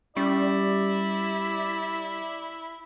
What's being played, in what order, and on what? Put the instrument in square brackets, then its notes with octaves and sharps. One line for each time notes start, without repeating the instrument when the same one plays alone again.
[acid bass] G3 [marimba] C#4 [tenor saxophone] E4 [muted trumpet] D5